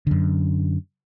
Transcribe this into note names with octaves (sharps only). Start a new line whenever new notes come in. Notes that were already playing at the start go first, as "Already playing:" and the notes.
F#2 D3